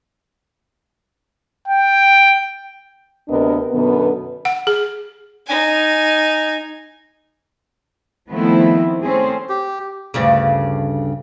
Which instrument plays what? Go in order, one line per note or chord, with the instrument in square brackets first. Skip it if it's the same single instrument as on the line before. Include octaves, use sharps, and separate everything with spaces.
[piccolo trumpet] G5
[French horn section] D2 C3 B3 D4 A#4 D#5
F#2 B2 D3 B3
[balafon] F#5
G#4
[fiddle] D#4 G#5
[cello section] D#3 F3 A3 B3 C4 E4
A3 C4 C#4 G#4 C5
[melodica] G4
[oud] D2 G2 C#3